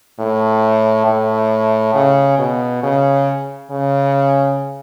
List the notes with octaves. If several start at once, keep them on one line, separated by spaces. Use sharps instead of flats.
A2
A2
C#3
B2
C#3
C#3